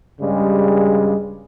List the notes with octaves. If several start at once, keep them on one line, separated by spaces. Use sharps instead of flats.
G2 C#3 G3 G#3